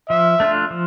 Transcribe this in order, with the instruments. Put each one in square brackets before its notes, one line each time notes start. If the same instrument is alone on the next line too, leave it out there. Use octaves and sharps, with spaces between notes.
[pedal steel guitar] F3 [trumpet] E5
[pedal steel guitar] A3 D4 F4
F3